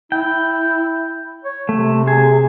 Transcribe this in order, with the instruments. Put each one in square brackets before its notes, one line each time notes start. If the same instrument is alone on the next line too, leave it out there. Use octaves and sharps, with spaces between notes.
[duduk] E4 [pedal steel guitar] G5
[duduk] C#5
[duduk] C3 [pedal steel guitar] A3
[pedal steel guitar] G#4